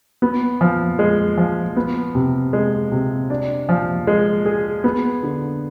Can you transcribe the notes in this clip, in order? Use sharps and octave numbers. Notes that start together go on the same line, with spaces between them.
B3
F3
G#3
F3
B3
C3
G#3
C3
D4
F3
G#3
G#4
B3
D3